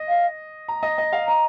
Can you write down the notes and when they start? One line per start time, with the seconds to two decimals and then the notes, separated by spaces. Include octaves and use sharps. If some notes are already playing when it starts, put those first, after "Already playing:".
Already playing: D#5
0.09 F5
0.68 A#5
0.83 D#5
0.98 D#5
1.13 F5
1.27 D#5 A#5